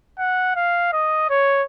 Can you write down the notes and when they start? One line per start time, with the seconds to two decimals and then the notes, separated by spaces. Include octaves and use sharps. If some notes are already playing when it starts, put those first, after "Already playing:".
0.19 F#5
0.56 F5
0.93 D#5
1.30 C#5